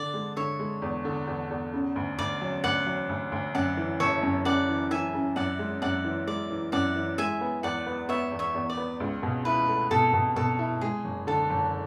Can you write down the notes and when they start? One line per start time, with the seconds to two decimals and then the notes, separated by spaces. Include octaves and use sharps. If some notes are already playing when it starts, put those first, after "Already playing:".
Already playing: D3 D5
0.14 G#3
0.37 D3 C#5 E5
0.59 G#3
0.82 E2
1.05 D3
1.27 E2
1.50 E2
1.73 C#3
1.96 D2
2.18 D2 D5
2.41 F#3
2.64 D2 D5 F#5
2.86 F#3
3.09 D2
3.32 D2
3.55 F#2 D5 F#5
3.77 E3
4.00 F#1 C#5 E5
4.23 F#2
4.45 C#3 D5 F#5
4.69 E3
4.91 E3 E5 G#5
5.14 C#3
5.36 F#2 D5 F#5
5.59 G#3
5.82 F#2 D5 F#5
6.04 E3
6.27 G#3 D5
6.50 E3
6.72 F#2 D5 F#5
6.96 E3
7.18 G#3 E5 G#5
7.41 B3
7.63 E2 D5 F#5
7.86 B3
8.09 B3 C#5 E5
8.32 E2
8.39 C#5 E5
8.54 E2
8.70 D5
8.77 B3
9.00 C#2
9.23 B2
9.45 E4 B4
9.68 A3
9.91 B2 A4
10.13 B2
10.36 B2 A4
10.59 E4
10.81 G#3 G#4
11.04 F#1
11.27 D3 A4
11.50 F#1